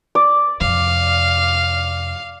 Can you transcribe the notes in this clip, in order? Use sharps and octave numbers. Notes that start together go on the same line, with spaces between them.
D5
F2 C3 F5